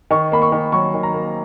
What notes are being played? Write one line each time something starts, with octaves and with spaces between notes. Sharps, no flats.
D#3 C#6
A#3 B5
C#6
D#3
F#3 C#6
D#3
A#5
A#3